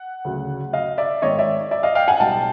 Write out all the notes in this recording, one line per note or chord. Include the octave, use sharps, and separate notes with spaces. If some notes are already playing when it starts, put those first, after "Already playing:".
Already playing: F#5
D2 C#3 F#3
D#5 F5
D5 E5
G#1 G#2 D#3 C#5 D#5
D5 E5
D5 E5
D#5 F5
F5 G5
F#5 G#5
B1 B2 G3 G5 A5